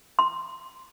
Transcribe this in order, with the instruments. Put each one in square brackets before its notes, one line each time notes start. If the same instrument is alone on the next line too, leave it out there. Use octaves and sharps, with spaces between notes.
[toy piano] C6